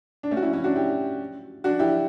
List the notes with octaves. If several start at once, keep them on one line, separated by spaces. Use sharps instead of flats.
D4
A3 C#4
F#4
C#4 E4
C#4 E4
D4 F#4
E4 G4
D4 F#4
E4 G4